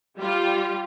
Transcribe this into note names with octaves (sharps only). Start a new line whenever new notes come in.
G3 F4